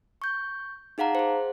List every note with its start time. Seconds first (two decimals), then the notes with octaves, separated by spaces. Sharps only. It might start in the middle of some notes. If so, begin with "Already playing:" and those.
0.22 C#6 G6
0.98 D#4 G#4 F5 F#5 A#5
1.15 G#4 C5